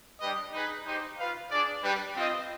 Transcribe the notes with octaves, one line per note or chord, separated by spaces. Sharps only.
G3 D4 G4 B4 D#5
D#4 G#4 B4
D#4 G4 C5
F4 B4 F5
D4 G#4 D5
G3 D4 G4 B4
C4 F4 C5 D#5